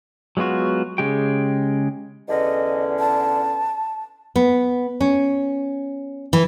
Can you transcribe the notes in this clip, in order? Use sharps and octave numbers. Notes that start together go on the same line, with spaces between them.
F#3 G#3 B3 F4 F#4
C#3 G#3 G4 G5
E2 D3 C#4 D#5
A5
B3
C#4
E3